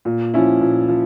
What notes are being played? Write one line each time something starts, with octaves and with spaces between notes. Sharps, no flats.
A#2
F3 C#4 E4
A#2
F3